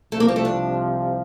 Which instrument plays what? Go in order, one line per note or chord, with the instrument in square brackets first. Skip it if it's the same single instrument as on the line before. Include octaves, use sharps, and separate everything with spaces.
[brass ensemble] C2 C3 F3 [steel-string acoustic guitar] A3
[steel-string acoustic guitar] A#3
C4
A3
D4